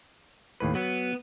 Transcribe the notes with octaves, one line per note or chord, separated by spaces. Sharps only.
D#2 A2 B4
F#3 B3